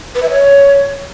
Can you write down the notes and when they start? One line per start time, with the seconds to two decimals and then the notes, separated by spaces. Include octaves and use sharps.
0.15 B4
0.22 E5
0.30 C#5